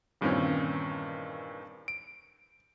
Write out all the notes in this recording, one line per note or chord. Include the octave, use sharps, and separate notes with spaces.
E2 G2 A#2 D#3 C4 C#4
D7